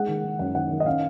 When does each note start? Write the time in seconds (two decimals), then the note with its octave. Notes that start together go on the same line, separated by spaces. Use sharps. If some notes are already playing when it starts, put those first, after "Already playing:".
Already playing: G#3 F#5
0.08 D#3
0.24 D#3
0.39 F#2 F#5
0.55 D#3 F#5
0.71 D#3
0.80 D#5
0.86 C#4 F5